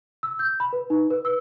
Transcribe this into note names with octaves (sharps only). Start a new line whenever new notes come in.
E6
G6
B5
B4
D#4
B4
E6